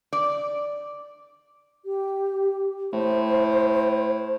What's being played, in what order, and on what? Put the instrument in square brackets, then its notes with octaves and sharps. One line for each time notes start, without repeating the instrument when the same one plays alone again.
[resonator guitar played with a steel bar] D5
[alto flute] G4
[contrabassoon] A2 [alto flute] C5